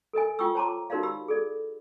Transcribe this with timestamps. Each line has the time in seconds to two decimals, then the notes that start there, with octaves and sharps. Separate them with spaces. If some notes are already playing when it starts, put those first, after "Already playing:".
0.13 A4 A#4 D#5 G#5
0.39 F4 G5 C#6 D#6 E6
0.55 C5 C#5 A5 A#5 C6 D6
0.90 D#4 F#4 A#4 C5 D5 F5
1.03 G4 B5 E6
1.28 G#4 A4 D5